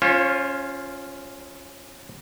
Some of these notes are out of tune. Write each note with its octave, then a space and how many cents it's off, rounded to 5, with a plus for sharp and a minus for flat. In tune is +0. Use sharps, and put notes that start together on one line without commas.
C#4 +5 F4 +0 C5 +40